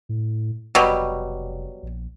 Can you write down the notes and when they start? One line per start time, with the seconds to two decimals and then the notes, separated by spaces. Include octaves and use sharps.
0.09 A2
0.75 F1 B2 F#3 G3
1.83 A#1